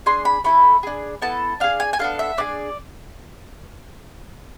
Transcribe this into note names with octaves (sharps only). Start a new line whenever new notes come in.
D4 G#4 C6
B5
A3 E4 A4 B5
D4 G#4
B3 E4 A4 A5
D4 G#4 F5
G#5
G#5
B3 D4 A4 F5
E5
D4 G#4 D5